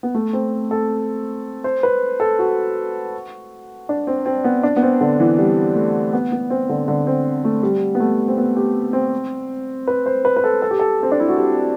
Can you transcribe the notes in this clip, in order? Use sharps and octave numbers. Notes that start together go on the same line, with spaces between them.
B3
A3
C4
A4
C5
B4
A4
F#4
D4
C4
C4
B3
D4
B3
C4
D3
E3
G3
A3
B3
B3
C4
D3
D3
C4
A3
G3
B3
A3
C4
B3
G4
C4
B4
C5
B4
B4
A4
A4
G4
A4
C4
D4
E4
F#4
G4